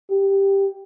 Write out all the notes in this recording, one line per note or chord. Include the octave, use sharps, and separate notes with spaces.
G4